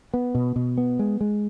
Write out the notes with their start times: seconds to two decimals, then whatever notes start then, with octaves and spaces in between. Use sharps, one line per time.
0.14 B3
0.35 B2
0.56 B2
0.78 B3
0.99 G#3
1.21 G#3